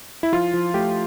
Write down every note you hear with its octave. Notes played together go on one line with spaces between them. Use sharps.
E4
F3 F4
F3
A3 G4